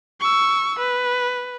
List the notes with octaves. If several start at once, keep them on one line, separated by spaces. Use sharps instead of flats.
C#6 E6
B4